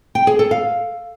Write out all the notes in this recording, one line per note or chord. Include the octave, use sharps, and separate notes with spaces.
G5
G#4
A4
F5